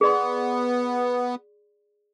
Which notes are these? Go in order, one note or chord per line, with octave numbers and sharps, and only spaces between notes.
B3 G#4 D5 C6